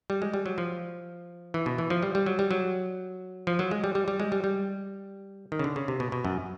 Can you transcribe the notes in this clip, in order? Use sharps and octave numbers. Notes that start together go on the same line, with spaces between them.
G3
G#3
G3
F#3
F3
E3
B2
E3
F3
G3
G3
F#3
G3
F#3
F3
F#3
G#3
G3
G3
G3
G#3
G3
G3
D#3
C#3
D3
C#3
C3
B2
B2
F#2